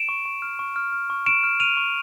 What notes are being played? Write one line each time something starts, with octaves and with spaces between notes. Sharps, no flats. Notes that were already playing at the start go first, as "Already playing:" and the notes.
Already playing: D7 E7
C#6
C#6
F6
C#6
F6
F6
C#6
C#6 D7 E7
F6
F6 D#7 F7
C#6